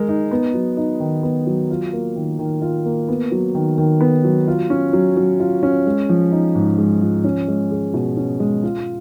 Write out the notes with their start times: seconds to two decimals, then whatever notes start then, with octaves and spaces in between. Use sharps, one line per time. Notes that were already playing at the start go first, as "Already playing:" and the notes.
Already playing: G#3 A#4
0.09 D#4
0.31 B3
0.54 F#3
0.77 D#4
1.00 D#3
1.23 B3
1.47 F#3
1.70 F4
1.93 A#3
2.16 D#3
2.39 D#3
2.62 F4
2.86 A#3
3.09 B3
3.32 F#3
3.55 D#3
3.78 D#3
4.01 B3
4.24 F#3
4.48 F4
4.70 C#4
4.93 F#3
5.17 F#3
5.40 F4
5.63 C#4
5.86 G#3
6.09 F3
6.32 D#4
6.55 G#2
6.78 G#3
7.02 F3
7.24 C#4
7.48 G#3
7.71 G#4
7.94 B2
8.17 C#4
8.40 G#3
8.63 F4